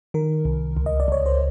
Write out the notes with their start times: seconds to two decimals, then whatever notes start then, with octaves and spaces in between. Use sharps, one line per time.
0.14 D#3 A#4
0.45 C2
0.77 C#2
0.86 D#5
1.00 D5
1.08 C#2 C#5
1.26 C5